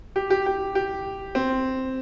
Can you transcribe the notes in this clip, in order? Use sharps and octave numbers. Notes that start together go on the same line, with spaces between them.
G4
G4
G4
G4
C4